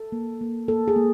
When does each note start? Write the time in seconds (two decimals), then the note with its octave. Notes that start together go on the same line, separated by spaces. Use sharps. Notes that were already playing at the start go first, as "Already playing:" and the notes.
Already playing: A4
0.12 A#3
0.41 A#3
0.68 A#3 A4
0.88 G#4
0.96 A#3